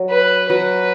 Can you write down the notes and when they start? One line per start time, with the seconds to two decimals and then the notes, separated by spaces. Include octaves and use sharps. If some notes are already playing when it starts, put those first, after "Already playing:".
Already playing: F#3
0.10 B4
0.49 F#3 B4